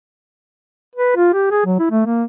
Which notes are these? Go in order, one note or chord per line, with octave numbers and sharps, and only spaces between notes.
B4
F4
G4
G#4
F#3
E4
A3
A#3